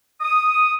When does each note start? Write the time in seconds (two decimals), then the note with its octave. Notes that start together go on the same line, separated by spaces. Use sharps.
0.21 D#6